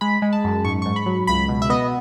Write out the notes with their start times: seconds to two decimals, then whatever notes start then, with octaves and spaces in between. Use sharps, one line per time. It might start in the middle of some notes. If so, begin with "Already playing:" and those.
0.01 G#3 B5
0.22 G#3
0.33 A5
0.44 F#2
0.65 G#2 C#6
0.82 G#2 C#6
0.96 B5
1.06 F#3
1.27 C#2 B5
1.48 B2
1.62 E5
1.70 B3 D#5